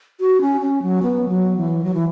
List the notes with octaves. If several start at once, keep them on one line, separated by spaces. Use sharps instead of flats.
F#4
C#4
C#4
F#3
B3
F#3
E3
F#3
E3